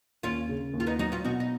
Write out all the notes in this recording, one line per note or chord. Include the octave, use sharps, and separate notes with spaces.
D#2 C#4 F4
C#3
D#2
F4
B3 D#4
F#3 D#4 F#4
C#4 F4
B2 D#4 F#4
D#4